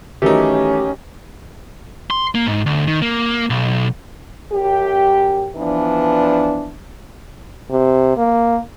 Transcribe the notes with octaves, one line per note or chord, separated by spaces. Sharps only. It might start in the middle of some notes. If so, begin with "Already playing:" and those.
D#3 E3 F#3 A3 C#4 D#4 G4
C6
A#3
G#2
D2
D#3
A#3
B1
F#2 G4
E3 F3 B3 D4
C3
A#3